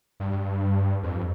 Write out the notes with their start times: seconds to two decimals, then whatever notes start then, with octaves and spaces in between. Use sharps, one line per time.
0.20 G2
1.03 F2